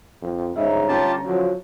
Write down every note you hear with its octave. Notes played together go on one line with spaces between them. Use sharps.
F2
G1 G#2 C#3 C#5 D#5 E5 A#5
C#4 F4 G4 A5
D3 F3 F#3